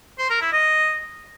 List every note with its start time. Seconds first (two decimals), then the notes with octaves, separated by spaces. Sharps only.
0.19 C5
0.30 A#4
0.41 E4
0.53 D#5